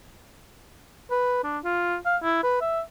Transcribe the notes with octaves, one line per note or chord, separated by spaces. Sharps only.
B4
D4
F4
F5
E4
B4
E5